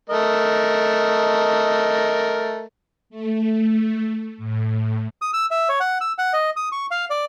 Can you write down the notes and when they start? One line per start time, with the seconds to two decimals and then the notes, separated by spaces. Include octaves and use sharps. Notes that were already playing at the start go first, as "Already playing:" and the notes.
0.10 A3 A#4 D#5
3.10 A3
4.38 A2
5.22 D#6
5.34 E6
5.51 E5
5.69 C#5
5.80 F#5
6.01 E6
6.18 F#5
6.33 D#5
6.56 D#6
6.72 C#6
6.91 F5
7.10 D5